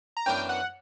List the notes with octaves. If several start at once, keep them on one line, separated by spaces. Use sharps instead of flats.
A#5
F#2 E3 B3 D4 A#4 G5
F#5